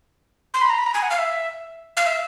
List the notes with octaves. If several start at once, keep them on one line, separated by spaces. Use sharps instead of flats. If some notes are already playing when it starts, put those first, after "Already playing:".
C6
B5
A#5
B5
A#5
G#5
F#5
F5
E5
F5
E5